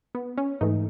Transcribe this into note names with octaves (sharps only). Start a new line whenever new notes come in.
B3
C#4
G#2 E3 A3 D#4